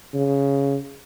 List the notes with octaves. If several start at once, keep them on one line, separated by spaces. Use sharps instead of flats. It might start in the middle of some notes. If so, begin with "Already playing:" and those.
C#3